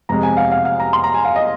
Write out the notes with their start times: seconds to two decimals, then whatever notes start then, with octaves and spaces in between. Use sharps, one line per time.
0.09 F2 C3 G#3 A#5
0.23 G#5
0.37 F5
0.52 F5
0.65 F5
0.80 A#5
0.93 C6
1.04 A#5
1.14 G#5
1.25 F5
1.36 D#5